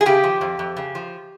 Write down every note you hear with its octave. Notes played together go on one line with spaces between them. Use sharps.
G#4
C#3 G4
F3
F2
F2
C#3
F3